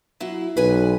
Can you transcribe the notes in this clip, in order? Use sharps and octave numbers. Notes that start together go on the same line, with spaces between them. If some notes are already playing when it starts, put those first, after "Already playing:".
F#3 E4
B1 B4 G#5